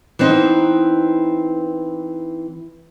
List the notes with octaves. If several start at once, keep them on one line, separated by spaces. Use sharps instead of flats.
E3 B3 C4 D#4